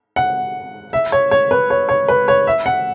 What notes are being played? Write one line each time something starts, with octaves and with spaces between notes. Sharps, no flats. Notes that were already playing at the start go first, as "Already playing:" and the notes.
F#5
E5
C#5
C#5
B4
C#5
C#5
B4
C#5
E5
F#5